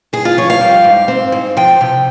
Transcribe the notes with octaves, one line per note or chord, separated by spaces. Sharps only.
G2 G#4
F4
F3 C#5
F5
G3
G#2
C4
G#2
F3 G5
C3